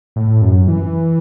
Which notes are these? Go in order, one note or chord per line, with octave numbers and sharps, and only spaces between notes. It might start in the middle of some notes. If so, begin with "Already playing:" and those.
A2
F#2
E3